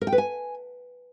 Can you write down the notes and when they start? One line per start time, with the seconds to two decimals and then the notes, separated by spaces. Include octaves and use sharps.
0.01 A#4
0.07 G5
0.12 B4
0.18 G#5